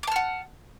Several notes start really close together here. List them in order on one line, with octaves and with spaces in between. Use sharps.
D6 A5 F6 F#5